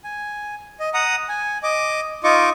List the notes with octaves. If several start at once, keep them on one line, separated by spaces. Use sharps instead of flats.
G#5
D#5
F#5 A#5 D#6
G#5
D#5 D6
D#4 F4 D#5 C#6 D6